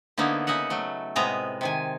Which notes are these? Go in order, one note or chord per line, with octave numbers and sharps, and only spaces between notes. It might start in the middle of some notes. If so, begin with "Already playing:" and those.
D3 A#3 B3 D#4 E4
C#3 D#4 D#5 E5 F#5
F#3 A3
A2 C3 G#3 B3 D#5 A#5
C3 D#3 G#5